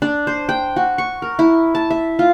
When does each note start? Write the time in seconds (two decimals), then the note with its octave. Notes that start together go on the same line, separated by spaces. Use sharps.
0.02 D4
0.27 C5
0.49 G5
0.76 F#4
0.98 C#6
1.22 A#4
1.39 E4
1.75 A5
1.90 E5
2.19 F4